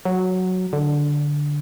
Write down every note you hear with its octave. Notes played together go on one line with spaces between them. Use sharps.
F#3
D3